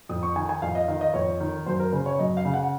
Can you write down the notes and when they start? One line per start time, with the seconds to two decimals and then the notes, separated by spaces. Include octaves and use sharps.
0.09 F2 D#6
0.23 C#6
0.36 D#3 G#5
0.49 G#5
0.62 F2 F5
0.75 D#5
0.88 D#3 F5
1.01 D#5
1.14 F2 C#5
1.40 D#3
1.66 F#2 C5
1.80 A#4
1.92 C#3 C5
2.06 C#5
2.19 F#2 D#5
2.37 F5
2.45 C#3
2.54 F#5